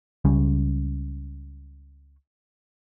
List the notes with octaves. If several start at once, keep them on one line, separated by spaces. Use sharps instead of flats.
C#2 G3 C#4